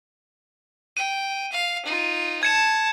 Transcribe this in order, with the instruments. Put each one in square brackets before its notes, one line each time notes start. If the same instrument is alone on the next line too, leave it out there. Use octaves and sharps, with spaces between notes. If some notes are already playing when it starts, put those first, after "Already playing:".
[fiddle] G5 [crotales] D#7
[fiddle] F5
D#4 F4
[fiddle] A5 [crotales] G#6 C#7 E7